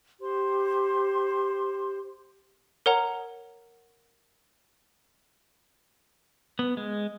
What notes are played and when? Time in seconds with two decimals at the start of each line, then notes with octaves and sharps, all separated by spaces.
0.21 G4 C5 C6
2.86 A#4 C#5 F#5 A#5
6.59 B3
6.77 G#3